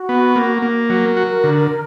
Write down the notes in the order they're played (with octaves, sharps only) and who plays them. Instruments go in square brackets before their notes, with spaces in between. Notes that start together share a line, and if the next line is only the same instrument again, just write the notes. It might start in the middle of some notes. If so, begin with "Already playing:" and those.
Already playing: [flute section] F#4
[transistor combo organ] B3
A#3
A#3
[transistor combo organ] F#3 [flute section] A#4
[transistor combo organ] F#4
D3